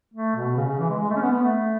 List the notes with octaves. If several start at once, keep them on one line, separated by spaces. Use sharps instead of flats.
A3
B2
C#3
C#3
E3
G#3
G#3
A3
C#4
B3
B3
A3